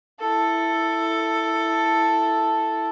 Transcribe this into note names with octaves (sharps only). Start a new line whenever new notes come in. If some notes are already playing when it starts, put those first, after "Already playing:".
E4 A4